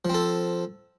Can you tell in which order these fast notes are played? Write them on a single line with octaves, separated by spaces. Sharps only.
F3 C4 A4